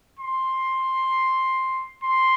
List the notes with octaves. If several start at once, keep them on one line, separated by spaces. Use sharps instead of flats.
C6
C6